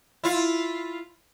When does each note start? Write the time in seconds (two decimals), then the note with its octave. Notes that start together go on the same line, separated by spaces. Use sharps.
0.24 E4 F4